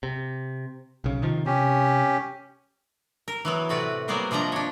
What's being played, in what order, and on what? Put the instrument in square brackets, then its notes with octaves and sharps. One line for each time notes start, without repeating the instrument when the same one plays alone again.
[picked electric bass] C3
B1 C#3
C3 D#3 F3
[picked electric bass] C3 [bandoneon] C#4 G4
[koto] A#4
E3 F#3 B3
A2 C3 F#4 B4 D5
F#3 G3 A#3 B3 A#4 C5
C3 F3 D4 D#5 A#5
D4 C#5